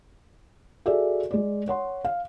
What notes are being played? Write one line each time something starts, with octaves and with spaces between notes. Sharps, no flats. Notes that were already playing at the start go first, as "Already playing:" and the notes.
F#4 G#4 A4 D5 E5
G#3 D5
C#5 F#5 C6
F5